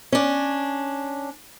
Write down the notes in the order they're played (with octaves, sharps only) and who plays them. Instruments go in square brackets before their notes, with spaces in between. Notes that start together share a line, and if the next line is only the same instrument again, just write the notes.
[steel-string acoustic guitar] C#4 D4